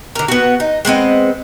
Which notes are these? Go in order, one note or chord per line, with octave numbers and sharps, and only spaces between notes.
D3 A#4
B3 F#4
D#4
G#3 B3 C4 D#5